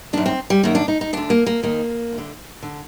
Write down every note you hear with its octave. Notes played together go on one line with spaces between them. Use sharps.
F#2 D#3 D4
C4
G3
F#2 D#3 A#3
D4
D#4
D#4
D2 D3 D4
A#3
A#3
D#2 D#3 A#3
D2
D3
D3